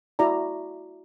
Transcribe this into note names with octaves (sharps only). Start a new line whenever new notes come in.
E4 F#4 D5 A#5